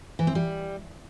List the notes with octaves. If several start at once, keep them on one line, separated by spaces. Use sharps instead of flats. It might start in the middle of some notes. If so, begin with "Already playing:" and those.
E3
C4
G3